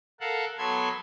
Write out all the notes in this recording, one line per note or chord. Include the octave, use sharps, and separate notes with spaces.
A4 A#4 F5 F#5
F#3 B3 A4 B5 C6 G#6